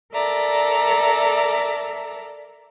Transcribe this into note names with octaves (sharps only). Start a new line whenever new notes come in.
A4 A#4 D5 E5 A#5